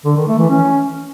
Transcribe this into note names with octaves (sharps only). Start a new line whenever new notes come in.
D3
D#3
A3
E3
C#4